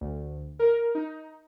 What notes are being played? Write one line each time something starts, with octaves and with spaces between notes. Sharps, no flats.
D2
A#4
D#4